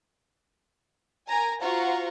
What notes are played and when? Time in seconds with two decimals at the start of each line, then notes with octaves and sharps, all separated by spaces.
1.28 A#4 G#5 A#5
1.61 F4 F#4 C5 F#5 A#5 C#6